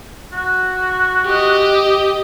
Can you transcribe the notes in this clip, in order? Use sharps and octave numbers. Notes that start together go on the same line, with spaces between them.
F#4
G4 D#5